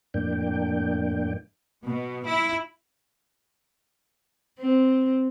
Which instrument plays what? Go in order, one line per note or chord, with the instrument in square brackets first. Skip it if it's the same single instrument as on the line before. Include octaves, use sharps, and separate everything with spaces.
[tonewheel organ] F2 A2 A#3 D4 G5
[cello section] B2
E4
[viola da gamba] C4